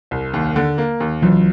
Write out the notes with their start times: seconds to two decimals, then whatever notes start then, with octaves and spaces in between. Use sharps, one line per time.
0.11 C2
0.33 D#2
0.56 D3
0.78 A#3
1.00 D#2
1.22 C#2 E3 F#3